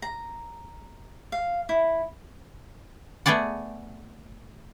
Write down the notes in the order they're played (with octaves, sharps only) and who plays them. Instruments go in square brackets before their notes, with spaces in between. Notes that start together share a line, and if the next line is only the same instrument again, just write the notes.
[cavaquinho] A#5
F5
E4
[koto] A3 B3 G#4 D5 F#5